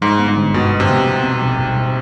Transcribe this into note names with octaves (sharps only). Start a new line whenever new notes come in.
G#2 G3
B3
G#2
D3
G2 B2
G3
C3
B3
C4
B2
G3
B2
C4